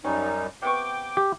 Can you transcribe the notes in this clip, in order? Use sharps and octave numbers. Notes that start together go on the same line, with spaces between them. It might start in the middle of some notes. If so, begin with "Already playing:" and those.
F#2 G3 C#4 D#4
C3 B3 G5 C#6 D6 G6
G4